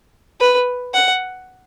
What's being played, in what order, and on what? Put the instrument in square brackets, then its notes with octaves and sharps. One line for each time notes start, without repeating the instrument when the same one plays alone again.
[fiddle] B4
F#5